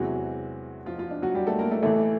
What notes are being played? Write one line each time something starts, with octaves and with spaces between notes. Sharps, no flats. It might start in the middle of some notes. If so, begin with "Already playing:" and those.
Already playing: E2 C3 E3 F#3 G#3 F#4
F3 F4
F3 F4
D4
F#3 F#4
G3 G4
A3 A4
A#3 A#4
A3 A4
A1 A2 E3 A3 A4